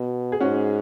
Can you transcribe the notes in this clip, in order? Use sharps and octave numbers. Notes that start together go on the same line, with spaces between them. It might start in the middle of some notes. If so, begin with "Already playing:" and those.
Already playing: B2
G#4
G#2 C#4 F#4